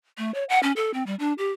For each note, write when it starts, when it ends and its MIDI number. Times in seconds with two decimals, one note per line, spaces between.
0.18 0.33 57
0.34 0.44 73
0.49 0.60 78
0.63 0.72 61
0.76 0.91 69
0.94 1.05 60
1.06 1.15 55
1.19 1.33 62
1.38 1.51 67